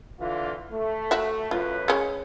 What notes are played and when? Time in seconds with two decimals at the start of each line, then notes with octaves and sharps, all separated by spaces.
0.19 D3 E3 F4
0.71 A3
1.11 F#4 E5
1.51 F#2 A2 F4 B4
1.88 G#3 C#4